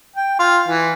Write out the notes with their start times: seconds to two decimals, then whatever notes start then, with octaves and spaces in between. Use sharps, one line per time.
0.16 G5
0.40 F4
0.68 E3